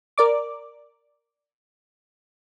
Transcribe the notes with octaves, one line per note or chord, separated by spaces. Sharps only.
A#4 D5 D6